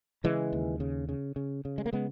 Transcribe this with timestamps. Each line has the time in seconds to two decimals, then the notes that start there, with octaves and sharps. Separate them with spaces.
0.24 C#3 E3 G#3
0.53 D#2
0.80 C#3
1.09 C#3
1.36 C#3
1.65 C#3
1.78 G#3
1.86 A#3
1.93 C#3 G#3 B3